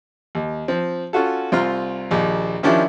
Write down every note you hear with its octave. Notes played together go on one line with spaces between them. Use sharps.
D#2
F3 C4
C#4 F4 F#4 A4
C2 C4 F4 A#5 C6 F6
A#1 D#2
D#3 F3 G3 C#4 D4 E4